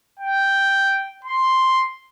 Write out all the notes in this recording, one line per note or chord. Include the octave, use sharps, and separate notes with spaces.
G5
C6